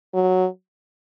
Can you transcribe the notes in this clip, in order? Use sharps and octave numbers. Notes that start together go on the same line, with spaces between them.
F#3